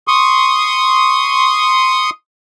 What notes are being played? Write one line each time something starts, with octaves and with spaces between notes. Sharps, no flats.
C6 C#6 D#6